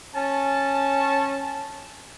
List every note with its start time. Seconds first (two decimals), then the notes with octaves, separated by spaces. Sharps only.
0.14 C#4 A5